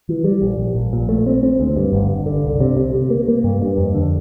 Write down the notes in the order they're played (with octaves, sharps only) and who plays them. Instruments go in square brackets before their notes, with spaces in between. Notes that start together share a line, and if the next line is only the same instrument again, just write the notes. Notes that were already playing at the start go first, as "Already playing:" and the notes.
[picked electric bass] E3
G3
A#1
A#1
A#1
A#2
A3
C4
C4
D2
G2
G1
G1
D3
C2
C3
C3
C3
A#3
A#3
G2
G2
F2
D3